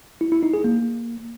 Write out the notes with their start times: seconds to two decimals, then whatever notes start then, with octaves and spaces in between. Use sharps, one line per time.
0.21 E4
0.32 E4
0.43 D#4
0.54 G#4
0.64 A#3